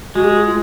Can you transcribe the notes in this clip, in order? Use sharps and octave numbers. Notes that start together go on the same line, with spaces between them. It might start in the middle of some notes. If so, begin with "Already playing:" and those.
G#3 F#4
G#4
F#4
F4